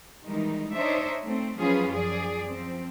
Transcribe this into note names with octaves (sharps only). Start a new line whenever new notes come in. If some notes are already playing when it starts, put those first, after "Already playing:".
D#3 E3 G3 G#3 D#4
D4 D#4 C5 C#5 D#5 E5
A3 C4
F3 F#3 C#4 F4 G#4 B4
F#2 F3 G#4 D5
F3 C4